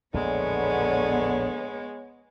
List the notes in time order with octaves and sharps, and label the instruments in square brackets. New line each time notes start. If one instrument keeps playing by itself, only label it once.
[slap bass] A#1 E2 A2 [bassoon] D3 [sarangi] G#3 [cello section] B3 C#5